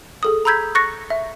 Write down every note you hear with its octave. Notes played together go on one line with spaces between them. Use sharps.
G#4 A4 D#6
A#5 B5 E6 G6 G#6 B6
C#6 F#6 A6 A#6 C#7
E5